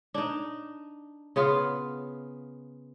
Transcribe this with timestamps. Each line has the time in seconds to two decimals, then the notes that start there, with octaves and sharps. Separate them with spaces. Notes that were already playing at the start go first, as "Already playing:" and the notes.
0.14 D4 D#4
1.36 C#3 B3 F4